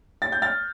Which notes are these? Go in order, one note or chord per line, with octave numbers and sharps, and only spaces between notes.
A6
G6
F6 A6